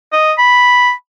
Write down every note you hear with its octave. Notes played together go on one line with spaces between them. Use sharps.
D#5
B5